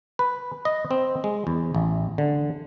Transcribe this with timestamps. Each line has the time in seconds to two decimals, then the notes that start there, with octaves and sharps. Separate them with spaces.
0.19 B4
0.65 D#5
0.91 C4
1.24 G#3
1.47 E2
1.75 A1
2.18 D3